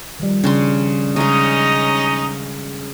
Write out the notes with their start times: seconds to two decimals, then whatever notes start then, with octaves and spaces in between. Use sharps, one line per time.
0.20 D#3 F3 G3
0.44 C#3 C#4 D4 C6
1.16 C#3 G#3 C#4 D#4 D#5